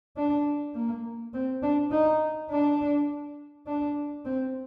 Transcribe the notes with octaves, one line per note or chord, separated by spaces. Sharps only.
D4
A#3
C4
D4
D#4
D4
D4
C4